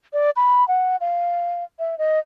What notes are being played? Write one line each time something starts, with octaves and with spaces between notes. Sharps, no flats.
D5
B5
F#5
F5
E5
D#5